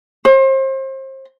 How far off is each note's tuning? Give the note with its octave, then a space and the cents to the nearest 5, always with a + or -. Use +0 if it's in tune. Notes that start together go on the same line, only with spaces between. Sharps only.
C5 +35